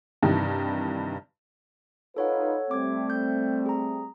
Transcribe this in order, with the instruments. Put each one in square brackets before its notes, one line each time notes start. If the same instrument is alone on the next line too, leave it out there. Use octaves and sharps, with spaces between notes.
[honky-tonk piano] G2 C3 D#3 E3
[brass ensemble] D#4 F4 B4 [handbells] A4 C#5 F#5
[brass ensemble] G3 A3 C4 [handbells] D6 G#6
[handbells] G6
G#4 A#5